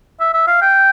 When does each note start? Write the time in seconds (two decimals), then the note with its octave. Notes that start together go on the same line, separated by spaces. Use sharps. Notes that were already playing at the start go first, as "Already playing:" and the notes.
0.21 E5
0.34 E5
0.47 F5
0.62 G5